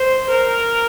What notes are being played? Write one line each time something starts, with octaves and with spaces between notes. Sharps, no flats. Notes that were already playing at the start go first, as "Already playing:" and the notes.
Already playing: C5
A#4